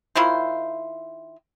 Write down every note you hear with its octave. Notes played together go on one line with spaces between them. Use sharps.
D#3 E4 F4 C5